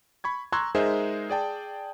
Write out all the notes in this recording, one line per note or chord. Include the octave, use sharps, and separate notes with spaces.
B5 C#6 G#6
A#5 C6 C#6 E6 F#6 G#6
G#3 D#4 G#4 A#4 C5 E5
G#4 D5 G5 A5